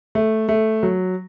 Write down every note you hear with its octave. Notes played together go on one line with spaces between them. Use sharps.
A3
A3
F#3